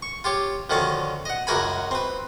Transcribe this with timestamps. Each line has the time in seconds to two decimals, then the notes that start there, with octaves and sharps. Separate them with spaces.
0.02 C#6
0.24 F4 G4 C#5
0.70 D2 D#3 F3 C#4 A5
1.25 D#5 F#5
1.47 C#2 F#2 F#3 A#4 G#5 B5
1.91 C4 B4